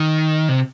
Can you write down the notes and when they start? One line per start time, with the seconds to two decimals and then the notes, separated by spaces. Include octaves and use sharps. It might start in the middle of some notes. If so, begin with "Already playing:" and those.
Already playing: D#3
0.49 C3